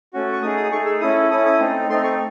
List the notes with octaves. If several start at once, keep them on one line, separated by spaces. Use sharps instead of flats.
A3 C#4 F#4
C#6
A3 D#4 G#4 D#6
D#6
A3 D#4 G#4 C#6
E6
C#4 E4 A4 D#6
C#4 E4 A4 D#6
D#6
A3 C4 D#4
A3 C4 D#4 C6
C#6